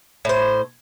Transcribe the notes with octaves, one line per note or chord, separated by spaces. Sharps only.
A2 C5